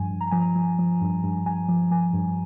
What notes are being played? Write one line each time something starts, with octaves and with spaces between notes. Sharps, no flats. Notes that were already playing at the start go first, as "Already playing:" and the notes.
Already playing: G2 F3 G#5
G2
A#5
F3 G#5
A#5
F3
F3
G2
G2
G2 G#5
F3
F3 G#5
G2